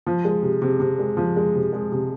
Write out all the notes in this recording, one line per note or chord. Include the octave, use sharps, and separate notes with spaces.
F3
G#3
C3
C3
C3
G#3
F3
G#3
C3
G#3
C3